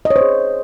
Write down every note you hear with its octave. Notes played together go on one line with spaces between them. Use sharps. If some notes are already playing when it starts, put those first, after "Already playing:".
D#5
C#5
C5
G#4